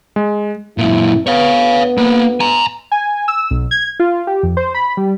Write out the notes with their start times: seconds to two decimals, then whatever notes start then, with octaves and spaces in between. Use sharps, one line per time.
0.16 G#3
0.78 F#2 A#2 E4
1.27 D2 B3 C#5 F5
1.98 A#3 B5
2.40 G#5 A#5
2.92 G#5
3.28 E6
3.51 B1
3.71 G#6
4.00 F4
4.27 G4
4.43 F2
4.57 C5
4.74 B5
4.97 G3